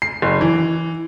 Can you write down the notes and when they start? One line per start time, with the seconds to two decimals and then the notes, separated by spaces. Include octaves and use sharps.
0.02 C7
0.22 F#1
0.41 E3